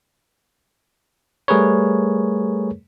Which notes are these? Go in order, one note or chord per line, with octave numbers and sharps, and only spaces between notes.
G3 A3 G#4 A#4 B4 C#5